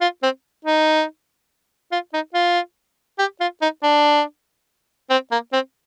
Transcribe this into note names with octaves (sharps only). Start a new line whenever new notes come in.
F4
C4
D#4
F4
D#4
F4
G4
F4
D#4
D4
C4
A#3
C4